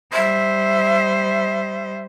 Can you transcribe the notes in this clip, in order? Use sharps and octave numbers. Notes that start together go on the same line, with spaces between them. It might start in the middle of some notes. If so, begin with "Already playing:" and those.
G3 C5 E5